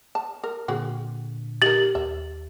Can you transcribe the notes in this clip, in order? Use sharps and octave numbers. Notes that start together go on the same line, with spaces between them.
A5
A#4
A#2 D3 C4 F#4 G#4
D#4 G4 A#4 A6 F#7
D#2 E5